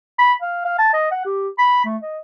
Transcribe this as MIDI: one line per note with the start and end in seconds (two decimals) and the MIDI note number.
0.18 0.33 83
0.42 0.65 77
0.65 0.75 77
0.79 0.88 81
0.93 1.10 75
1.11 1.21 78
1.25 1.49 67
1.59 1.84 83
1.85 1.97 57
2.03 2.18 75